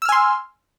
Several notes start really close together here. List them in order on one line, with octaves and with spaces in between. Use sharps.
E6 F6 G#5 C6